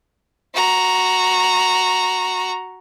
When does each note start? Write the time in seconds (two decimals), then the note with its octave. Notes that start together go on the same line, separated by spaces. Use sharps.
0.54 F#4 A#5